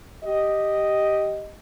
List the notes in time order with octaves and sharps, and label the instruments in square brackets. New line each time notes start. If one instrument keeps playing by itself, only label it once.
[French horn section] G4 D#5